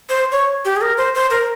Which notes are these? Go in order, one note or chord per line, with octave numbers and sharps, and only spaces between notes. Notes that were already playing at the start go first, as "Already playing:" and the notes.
C5
C#5
G4
G#4
A#4
C5
C5
A#4